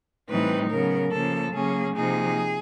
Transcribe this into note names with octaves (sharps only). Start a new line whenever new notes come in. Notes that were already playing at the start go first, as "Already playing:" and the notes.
A2 E3 G3 C4 D#4 B4
C#3 F#3 B3 A#4
C#3 F3 A#3 A4
C#3 F#3 A#3 C#4 G#4
C3 F3 A#3 D#4 G#4